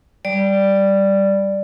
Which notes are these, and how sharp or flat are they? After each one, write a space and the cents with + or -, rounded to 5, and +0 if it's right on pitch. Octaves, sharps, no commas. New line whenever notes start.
G3 +0 D5 +0